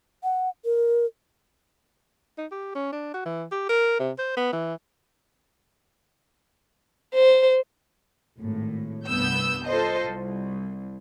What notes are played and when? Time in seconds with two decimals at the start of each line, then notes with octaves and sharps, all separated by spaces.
0.23 F#5
0.65 A#4
2.38 D#4
2.51 G4
2.75 C#4
2.93 D4
3.14 F#4
3.25 E3
3.52 G4
3.69 A#4
3.99 C3
4.19 C5
4.37 B3
4.53 E3
7.14 C5
8.39 G#1 A2
9.08 C2 G2 B3 E6 G6
9.67 F4 A4 C5 D#5
10.05 C2